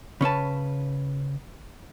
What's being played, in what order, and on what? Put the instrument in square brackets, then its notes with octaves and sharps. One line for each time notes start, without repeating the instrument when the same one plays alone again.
[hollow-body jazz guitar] C#3 C#4 B4 A5